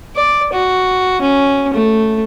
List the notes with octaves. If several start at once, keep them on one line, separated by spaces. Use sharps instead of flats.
D5
F#4
C#4
A3